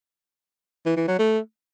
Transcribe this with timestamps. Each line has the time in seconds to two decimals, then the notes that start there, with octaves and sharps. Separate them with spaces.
0.86 E3
0.97 E3
1.08 F#3
1.19 A3